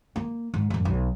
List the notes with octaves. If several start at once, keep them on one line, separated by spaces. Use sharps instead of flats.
A#3
G#2
A1 F#2
B1